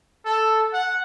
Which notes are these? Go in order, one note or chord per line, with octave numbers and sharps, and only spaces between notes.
A4
F#5